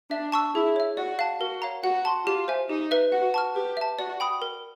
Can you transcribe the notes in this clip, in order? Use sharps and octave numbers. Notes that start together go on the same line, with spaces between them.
D4 E5
A5 C#6 E6
E4 G#4
C#5 E5
F#4 D5
F5 A5
F#4 A#4
C#5 F5 A#5
F#4 F#5
A5 C6
F4 G4
C5 E5 G#5
D#4 G4
B4 E5
F#4 F#5
A5 C#6 F6
G4 B4
E5 A5
F#4 D5
G5 B5 D#6
A#4